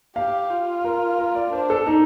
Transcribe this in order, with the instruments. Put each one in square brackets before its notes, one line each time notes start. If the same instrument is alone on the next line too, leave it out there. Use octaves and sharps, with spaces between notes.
[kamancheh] G4 [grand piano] F5
[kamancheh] F4
[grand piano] A#4
A#4
D5
[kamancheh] D4 [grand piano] C5
[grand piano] A4
D#4